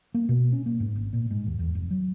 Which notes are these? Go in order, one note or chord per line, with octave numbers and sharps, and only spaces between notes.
A#3
B2
C#4
A#3
G#2
G#1
A#2
G#2
D#2
E2
F1
F#3